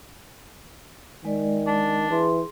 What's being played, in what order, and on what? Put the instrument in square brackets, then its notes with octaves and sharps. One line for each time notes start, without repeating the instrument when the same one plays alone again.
[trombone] D#3 [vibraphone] G#3 D5
[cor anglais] D4
[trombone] E3 [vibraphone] G#4 C6